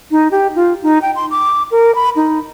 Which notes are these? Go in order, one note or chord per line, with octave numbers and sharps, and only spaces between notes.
D#4
G4
F4
D#4
G5
C6
D6
A#4
B5
D#4